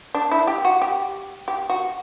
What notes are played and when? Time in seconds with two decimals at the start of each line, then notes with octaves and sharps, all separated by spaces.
0.14 D4
0.31 E4
0.47 G4
0.65 F#4
0.82 G4
1.48 G4
1.70 F#4